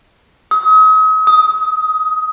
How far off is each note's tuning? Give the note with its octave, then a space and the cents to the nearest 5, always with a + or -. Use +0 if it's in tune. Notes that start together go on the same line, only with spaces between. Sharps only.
D#6 +40
D#6 +15